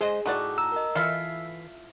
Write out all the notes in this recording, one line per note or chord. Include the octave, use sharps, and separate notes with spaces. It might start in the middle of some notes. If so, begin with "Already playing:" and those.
G#3 G#4 C5 D#5
A2 D#4 F#4 D5
A#5 E6
A#4 D#5
E3 E4 F4 A4 B6 C7